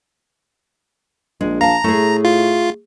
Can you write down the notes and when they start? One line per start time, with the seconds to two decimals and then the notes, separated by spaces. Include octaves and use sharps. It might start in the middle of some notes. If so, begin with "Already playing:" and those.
1.41 A#1 G#3
1.61 F5 A5 A#5
1.84 A2 A3 G#4
2.25 F4